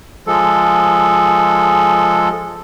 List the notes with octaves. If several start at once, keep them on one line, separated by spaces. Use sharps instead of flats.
F3 G#3 A4